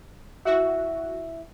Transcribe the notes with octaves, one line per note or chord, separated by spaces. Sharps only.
E4 F#4 E5